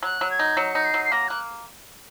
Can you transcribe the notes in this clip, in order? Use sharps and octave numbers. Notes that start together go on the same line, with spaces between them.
F#3 F#6
F#3
G#6
D#4
F#3 C#7
D#4
C7
F#3
C7
A#3 A#6
A#3 F#6